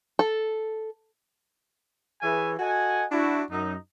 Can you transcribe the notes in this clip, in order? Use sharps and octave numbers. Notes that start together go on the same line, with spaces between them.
A4
E3 G#4 B4 C#5 E5 G#5
F#4 A4 D#5 F#5 G#5
D4 E4 F#4
F#2 D#4